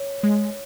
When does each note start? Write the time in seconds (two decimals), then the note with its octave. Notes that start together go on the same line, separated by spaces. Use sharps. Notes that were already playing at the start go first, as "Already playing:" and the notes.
Already playing: C#5
0.23 G#3